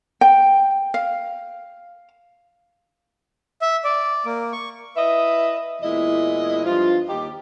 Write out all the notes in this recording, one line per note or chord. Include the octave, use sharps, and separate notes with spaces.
G5
F5
E5
D5
A#3
C#6
E4 B4 D#5 E5
E2 A#2 G#3 E4 D#5
G2 F3 F4
D#2 D#4 G4